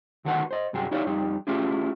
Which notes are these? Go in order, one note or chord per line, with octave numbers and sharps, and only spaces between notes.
D2 D#3 F#4 A4 B4 F#5
C5 D#5
C2 G2 F#3 F#4 G#4 G5
D#4 E4 G4 C#5 D5 F5
F2 G3 D#4 G4
A3 C#4 E4 F4 G4 G#4